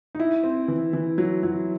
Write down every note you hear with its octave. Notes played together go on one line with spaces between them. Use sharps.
D#4
E4
C4
E3
E3
F#3
F#3